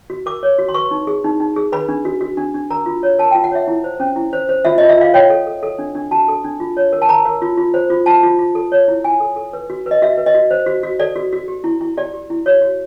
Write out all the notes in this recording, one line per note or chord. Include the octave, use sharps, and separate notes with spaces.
F#4
A#4 D6
C#5
F#4
C6
B4 C#6
D#4
G#4
D#4
D#4
G#4
B4 B5
D4
F#4
F#4
D4
D4
A#4 A#5
F4
C#5
A#4 A5
G5
F4
F#5
C#5 E5
E4
C5
C#4
E4
C5
C5
F4 E5
D#5
F4
E5
F4 F5
C#5 G5
A4
A4
A4
D4
D4
F#4 A5
A4
D4
F4
C#5
A#4
A5
A#4 A#5
A#4
F4
F4
C5
F4
F4 A5
F4
F4
A4
C#5
E4
E4 G#5
A4
A4
B4
F#4
B4 D#5
F#4 E5
B4
D#5
F#4
C5
F#4
F#4
A4 D5
F#4
F#4
G4
E4
E4
G4 D5
G4
E4
F#4 C#5
F#4